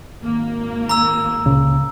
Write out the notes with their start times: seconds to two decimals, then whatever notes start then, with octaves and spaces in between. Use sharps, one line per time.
0.22 G#1 A#3
0.89 A#5 E6
1.45 C#2 A#2 C#3